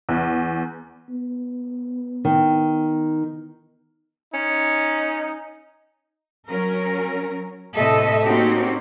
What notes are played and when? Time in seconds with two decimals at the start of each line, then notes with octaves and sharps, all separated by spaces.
0.09 E2
1.09 B3
2.25 D#3
4.34 C#4 D#4
6.48 F#3 C#4 A#4
7.74 A2 C3 A3 A4 D#5 E5
8.23 A#3 C4 C#4 D#4 F#4 G4